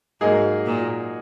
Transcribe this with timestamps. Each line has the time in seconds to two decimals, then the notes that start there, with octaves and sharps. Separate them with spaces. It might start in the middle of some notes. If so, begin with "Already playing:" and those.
0.21 G#2 F#3 A#3 D#4 G#4
0.66 A#2